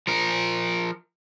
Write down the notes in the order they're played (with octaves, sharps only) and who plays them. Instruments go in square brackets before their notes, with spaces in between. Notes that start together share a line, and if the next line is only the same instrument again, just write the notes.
[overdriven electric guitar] F3 A#4